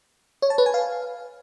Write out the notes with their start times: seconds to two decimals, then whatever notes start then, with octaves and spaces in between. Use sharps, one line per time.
0.42 C#5
0.50 A5
0.58 B4
0.66 G#5
0.74 F5